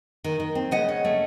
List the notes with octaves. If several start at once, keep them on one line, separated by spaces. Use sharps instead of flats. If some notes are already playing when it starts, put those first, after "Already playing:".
D#3
D#3
C4
C#3 D#5 F#5
C#4
A3